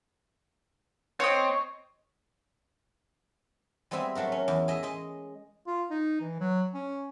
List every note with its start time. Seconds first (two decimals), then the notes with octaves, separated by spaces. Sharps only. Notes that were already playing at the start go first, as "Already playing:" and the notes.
1.20 C4 C#5 D#5
3.91 G3 G#3 B3 C4 E5 G#5
4.15 F#3 A3 F#4 A#4
4.32 C#4
4.48 E2
4.68 G#4 D#5 E5
4.83 G#3 D#5
5.67 F4
5.90 D#4
6.21 E3
6.40 F#3
6.74 C#4